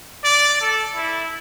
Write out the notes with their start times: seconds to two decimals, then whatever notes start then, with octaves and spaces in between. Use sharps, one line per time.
0.25 D5
0.61 A4
0.95 E4